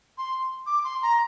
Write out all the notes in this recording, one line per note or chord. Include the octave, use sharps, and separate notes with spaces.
C6
D6
C6
A#5